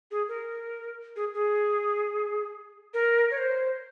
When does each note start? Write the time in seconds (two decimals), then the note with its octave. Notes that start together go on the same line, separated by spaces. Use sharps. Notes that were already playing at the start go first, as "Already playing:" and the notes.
0.11 G#4
0.28 A#4
1.16 G#4
1.34 G#4
2.94 A#4
3.31 C#5
3.38 C5